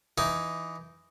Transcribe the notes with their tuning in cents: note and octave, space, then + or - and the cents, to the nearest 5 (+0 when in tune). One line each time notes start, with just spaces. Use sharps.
E3 +10 D#4 +0